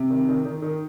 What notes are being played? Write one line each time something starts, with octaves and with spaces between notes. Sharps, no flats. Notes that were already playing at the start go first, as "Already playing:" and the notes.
Already playing: C3
D#3
D#3
D#3
D#3